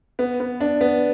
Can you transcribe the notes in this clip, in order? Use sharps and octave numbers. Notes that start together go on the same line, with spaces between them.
B3
B3
D4
B3